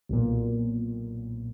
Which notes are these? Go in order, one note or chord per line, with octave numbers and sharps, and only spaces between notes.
B1 A#2